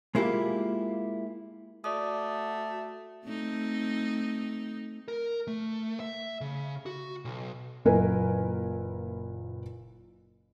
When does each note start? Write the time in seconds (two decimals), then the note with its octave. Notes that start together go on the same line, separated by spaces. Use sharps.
0.15 G#3 A#3 E4 F4 G4
1.84 A3 F#4 D5 D6 D#6
3.25 A3 C4 D#4
5.08 A#4
5.47 A3
6.00 E5
6.41 C#3
6.86 F#4
7.25 B1
7.85 F#1 A#2 E4 A#4 B4 G#5